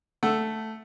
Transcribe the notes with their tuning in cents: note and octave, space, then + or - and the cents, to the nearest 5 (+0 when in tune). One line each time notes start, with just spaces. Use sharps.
A3 +0 F#5 +0 E6 +0